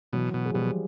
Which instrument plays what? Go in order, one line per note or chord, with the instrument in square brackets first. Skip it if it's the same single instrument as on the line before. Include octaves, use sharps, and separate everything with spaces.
[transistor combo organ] B2 [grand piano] E3 F#3
[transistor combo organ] B2
[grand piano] G#3
[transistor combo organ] B2 [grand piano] F3 G3